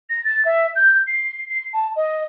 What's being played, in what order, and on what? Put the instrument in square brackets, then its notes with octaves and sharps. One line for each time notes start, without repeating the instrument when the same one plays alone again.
[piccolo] A#6
A6
E5
G6
C7
C7
A5
D#5